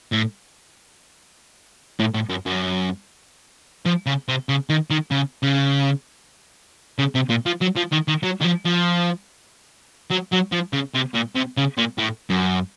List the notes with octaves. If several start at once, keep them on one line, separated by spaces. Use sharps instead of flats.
A2
A2
A2
F#2
F#2
F3
C#3
C3
C#3
D#3
D#3
C#3
C#3
C#3
C3
A#2
F3
F#3
F3
D#3
D#3
F#3
D#3
F3
F3
F#3
F#3
F3
C#3
C3
A#2
C3
C#3
A#2
A2
F#2